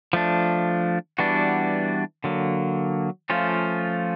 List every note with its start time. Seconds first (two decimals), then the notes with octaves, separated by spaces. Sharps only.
0.13 F3 A3 D4
1.18 E3 G3 B3 D4 F#4
2.24 D3 F#3 A#3
3.30 F3 A3 C#4 F4